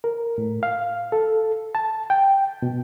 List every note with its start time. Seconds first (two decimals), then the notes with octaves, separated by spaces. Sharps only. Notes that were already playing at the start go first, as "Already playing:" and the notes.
0.04 A#4
0.38 A2
0.63 F5
1.12 A4
1.75 A5
2.10 G5
2.62 B2